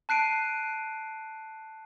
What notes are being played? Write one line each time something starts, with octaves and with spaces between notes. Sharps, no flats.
A5 F#6 C7 D7 D#7